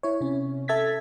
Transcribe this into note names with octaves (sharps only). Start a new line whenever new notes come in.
E4 C#5
C3 C#4
A4 E5 G#6 A6 B6